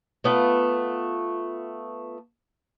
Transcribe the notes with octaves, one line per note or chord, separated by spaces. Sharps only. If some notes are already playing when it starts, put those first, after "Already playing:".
A3 B3 F4